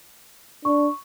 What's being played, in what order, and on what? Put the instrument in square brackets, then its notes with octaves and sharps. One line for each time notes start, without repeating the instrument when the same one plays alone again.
[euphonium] D4 [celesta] C#6